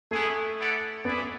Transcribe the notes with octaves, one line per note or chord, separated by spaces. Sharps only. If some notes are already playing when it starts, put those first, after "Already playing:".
A3 B3 E4 G#4
B3 E4 A4 D5 F#5
B3 E4 G#4 B4 D5